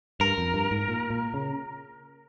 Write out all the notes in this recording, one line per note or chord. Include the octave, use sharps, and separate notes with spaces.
G2 A#4
F2
G2
G#2
A#2
A#2
C#3